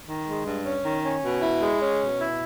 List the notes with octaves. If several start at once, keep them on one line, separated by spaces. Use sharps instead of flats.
D#3
G#3
G2
C#4
D#3
C#4
B2
E4
G#3
C#4
B2
E4